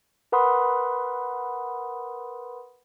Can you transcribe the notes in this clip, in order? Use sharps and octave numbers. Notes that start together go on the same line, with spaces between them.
A#4 B4 F#5 B5 C6 D#6